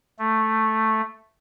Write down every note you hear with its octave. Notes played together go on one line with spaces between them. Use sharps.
A3